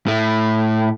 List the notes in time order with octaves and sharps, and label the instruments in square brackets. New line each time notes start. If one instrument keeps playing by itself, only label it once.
[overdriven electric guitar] A2 A3